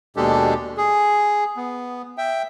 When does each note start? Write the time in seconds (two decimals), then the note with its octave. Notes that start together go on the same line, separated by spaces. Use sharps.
0.16 D#2 B2 G#3 D4 G4 A4
0.77 G#4
1.57 B3
2.18 E5 G5